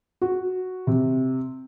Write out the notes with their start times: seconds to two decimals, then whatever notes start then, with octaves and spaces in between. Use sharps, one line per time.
0.22 F#4
0.87 C3